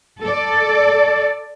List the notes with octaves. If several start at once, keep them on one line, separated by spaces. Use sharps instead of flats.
A4 D5